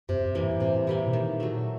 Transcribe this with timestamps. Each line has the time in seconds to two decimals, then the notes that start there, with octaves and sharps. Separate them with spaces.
0.09 F#2 C3
0.25 F#2
0.35 E3 G3 A#3
0.43 G#2
0.60 A2 C3
0.87 A2 E3 G3 A#3
1.07 B2
1.13 A#2 D#3
1.40 F#3 A3